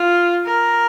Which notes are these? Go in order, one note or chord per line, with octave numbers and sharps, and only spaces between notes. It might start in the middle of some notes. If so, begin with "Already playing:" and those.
Already playing: F4
A#4